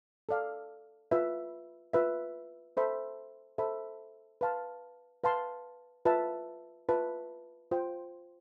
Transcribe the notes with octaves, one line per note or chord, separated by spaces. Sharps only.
A4 D5 F5
F4 B4 E5
F4 B4 E5
A4 C5 E5 B5
A4 C5 E5 B5
B4 F5 A5 C6
B4 F5 A5 C6
F4 B4 E5 A5
F4 B4 E5 A5
F4 C5 G5 C6